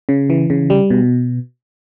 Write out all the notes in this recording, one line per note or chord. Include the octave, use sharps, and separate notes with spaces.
C#3
E3
C#3
G3
B2